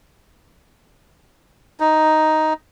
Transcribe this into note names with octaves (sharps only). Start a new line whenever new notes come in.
D#4